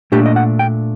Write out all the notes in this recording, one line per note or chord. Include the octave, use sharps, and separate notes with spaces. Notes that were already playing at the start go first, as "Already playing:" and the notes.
A#2 A3 D4 G4
D#5
F#5
G5